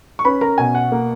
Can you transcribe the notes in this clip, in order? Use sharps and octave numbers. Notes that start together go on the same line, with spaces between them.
C#6
C#4 B4 B5
A#4 A#5
B2 G#5
F#5
A#3